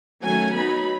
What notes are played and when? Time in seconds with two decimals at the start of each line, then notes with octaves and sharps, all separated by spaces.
0.23 D#3 F#3 A3 C#4 G#5
0.54 F#3 B3 D#4 B5